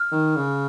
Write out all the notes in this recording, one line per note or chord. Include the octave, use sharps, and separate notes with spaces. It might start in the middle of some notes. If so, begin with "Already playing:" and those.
Already playing: F6
D#3
C#3